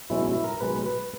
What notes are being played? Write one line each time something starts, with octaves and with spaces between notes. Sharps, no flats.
B1 B2 G#3 C#4 E4
E4
A#4
B1 B2 G#3 C#4 B4
B4